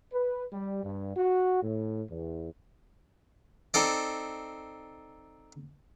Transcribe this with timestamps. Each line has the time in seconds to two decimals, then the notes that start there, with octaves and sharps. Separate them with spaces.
0.13 B4
0.52 G3
0.83 G2
1.16 F#4
1.63 A2
2.10 E2
3.74 C4 D#4 A4 D5